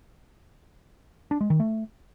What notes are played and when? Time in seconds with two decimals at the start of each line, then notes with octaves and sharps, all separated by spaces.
1.31 D4
1.41 G#3
1.50 D#3
1.60 A3